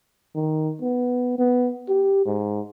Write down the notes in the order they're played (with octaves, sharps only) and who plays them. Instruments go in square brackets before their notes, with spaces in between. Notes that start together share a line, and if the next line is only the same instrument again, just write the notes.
[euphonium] D#3
B3
B3
G4
G#2